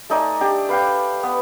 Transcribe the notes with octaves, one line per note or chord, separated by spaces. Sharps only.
A3 D#4 D5 G#5
D4 G4
B4 F5 G5
B3